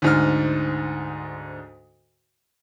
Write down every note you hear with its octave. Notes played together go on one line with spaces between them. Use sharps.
D2 G#2 F6